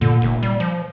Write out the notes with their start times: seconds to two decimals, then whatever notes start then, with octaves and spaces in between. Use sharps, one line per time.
0.01 A#2 D3
0.22 F1
0.43 G3
0.60 F3